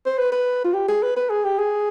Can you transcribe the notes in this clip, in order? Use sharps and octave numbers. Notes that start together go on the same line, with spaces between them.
C5
B4
B4
F4
G4
G#4
B4
B4
G#4
G4
G#4